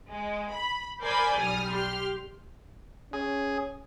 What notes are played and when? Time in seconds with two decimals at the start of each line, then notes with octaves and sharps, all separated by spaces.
0.10 G#3
0.52 B5
1.01 A#4 C5 D5 G#5 B5 G6
1.38 B1 G3 D#6 F6
1.71 G4 C6 F6
3.13 C#4 G#4